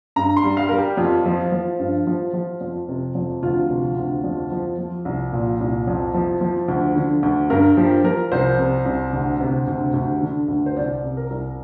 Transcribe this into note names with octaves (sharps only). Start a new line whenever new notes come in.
G2 A#5
C6
G3
F5
G3 A#4
G4
F2 F4
F3
F3
G2
F3
F3
F2
C3
F2
D2 F4
C3
D2
F2
F3
F3
C2
A#2
C2
F2
F3
F3
D2
D3
D2
G2 A#4
F3 G4
F3 A#4
C2 C5
C3
C2
D2
C3
D2
D2
D3
D2
C5
C2 D5
C3
A#4
C2